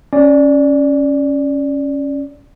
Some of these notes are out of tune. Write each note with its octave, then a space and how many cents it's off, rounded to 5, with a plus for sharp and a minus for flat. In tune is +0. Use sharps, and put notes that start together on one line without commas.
C#4 -5 D5 +0